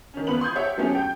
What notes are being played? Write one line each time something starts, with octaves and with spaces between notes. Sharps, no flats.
D#3 C#4
E2 B3 F4 B4 F#7
C6 D#6 G6 G#6
G4 C#5 E5 F#5
F#3 A3 B3 C#4 G4 G#4
G5 G6